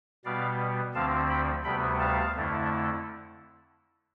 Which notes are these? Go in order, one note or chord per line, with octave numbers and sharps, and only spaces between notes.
B2 G3 B3 D5 F5
D2 D3 F3 C4 F5 A5
G5 B5
D2 C3 G3 B3 G5 B5
F5 A5
F2 D3 A3 E4